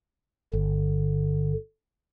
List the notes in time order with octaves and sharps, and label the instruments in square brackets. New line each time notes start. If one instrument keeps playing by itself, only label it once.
[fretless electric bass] G1 [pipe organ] D3